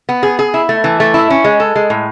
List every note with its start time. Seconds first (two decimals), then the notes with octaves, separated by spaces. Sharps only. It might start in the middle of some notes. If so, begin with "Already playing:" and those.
0.09 B3
0.23 G#4
0.39 G#4
0.54 E4
0.69 A3
0.84 E3
1.00 A3
1.14 E4
1.30 C#4
1.44 G#3
1.60 A4
1.76 G#3
1.90 A2